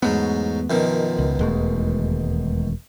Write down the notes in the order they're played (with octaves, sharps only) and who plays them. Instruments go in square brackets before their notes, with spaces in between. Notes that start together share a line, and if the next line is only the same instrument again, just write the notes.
[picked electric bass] E2 A3 B3 [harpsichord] G#2 F#3
[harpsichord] F#2 B2 D#3 [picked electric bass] F3
[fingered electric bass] C#2
[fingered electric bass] E1 [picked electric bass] D#2 G#3 A3